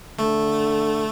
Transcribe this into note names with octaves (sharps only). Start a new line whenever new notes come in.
D3 A3